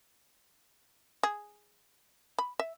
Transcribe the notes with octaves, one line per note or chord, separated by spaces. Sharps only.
G#4
B5
E5